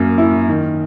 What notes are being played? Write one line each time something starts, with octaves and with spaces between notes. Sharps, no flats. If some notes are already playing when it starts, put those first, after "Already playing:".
Already playing: F#2 A#3
E4
D#3